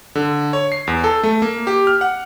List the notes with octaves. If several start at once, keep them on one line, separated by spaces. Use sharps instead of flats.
D3
C#5
C7
E2
A4
A3
A#3
G4
F6
F#5